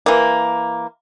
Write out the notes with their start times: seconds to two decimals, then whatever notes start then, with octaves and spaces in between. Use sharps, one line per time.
0.06 E3 A#3